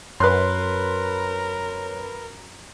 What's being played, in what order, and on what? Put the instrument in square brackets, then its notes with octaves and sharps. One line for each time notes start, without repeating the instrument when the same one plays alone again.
[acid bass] F#2 [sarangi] A#4 [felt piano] B4 C6 [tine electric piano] C#5 F#6